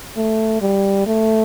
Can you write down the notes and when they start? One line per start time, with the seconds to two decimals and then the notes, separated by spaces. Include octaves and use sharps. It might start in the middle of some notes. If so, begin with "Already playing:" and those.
0.17 A3
0.62 G3
1.07 A3